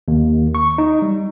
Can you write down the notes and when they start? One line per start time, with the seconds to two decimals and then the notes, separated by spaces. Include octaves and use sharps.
0.08 D#2
0.55 C#6
0.78 D#4
1.02 G3